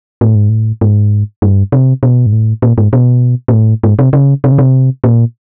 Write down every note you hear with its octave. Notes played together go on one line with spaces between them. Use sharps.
A2
G#2
A2
G#2
G2
C3
B2
G#2
A2
A#2
G#2
B2
A#2
A2
G#2
C3
C#3
C3
C#3
C3
A#2